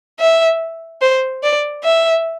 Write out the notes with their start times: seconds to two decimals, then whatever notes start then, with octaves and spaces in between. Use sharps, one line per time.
0.20 E5
1.02 C5
1.43 D5
1.84 E5